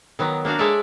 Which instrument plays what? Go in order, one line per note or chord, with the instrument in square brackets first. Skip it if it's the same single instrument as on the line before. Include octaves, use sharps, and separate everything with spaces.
[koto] D#3 F#3 B3
A#3 D4 F#4 F5
G#3 A4 C#5 D5 E5 A5